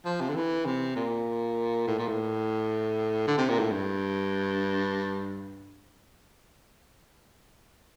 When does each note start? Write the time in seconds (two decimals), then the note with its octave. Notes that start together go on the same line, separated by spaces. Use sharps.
0.05 F3
0.21 C3
0.29 D3
0.36 E3
0.66 C3
0.96 A#2
1.88 A2
1.99 A#2
2.08 A2
3.27 D3
3.38 C3
3.49 A#2
3.59 A2
3.71 G2